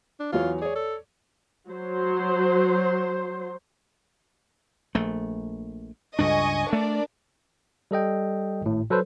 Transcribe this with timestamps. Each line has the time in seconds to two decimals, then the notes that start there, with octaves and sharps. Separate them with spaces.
0.20 D4
0.32 E2 F#3 F4 C#5
0.61 G#4 C#5 D5
0.75 A4
1.69 F#3 C5
4.95 A#1 A3
6.19 C#2 G2 D4 D#5 G#5 C#6
6.73 A3 D4 A#4 D5
7.91 G3 A4 D#5 G5
8.61 G#1 A2
8.90 F#3 A4 B4 C5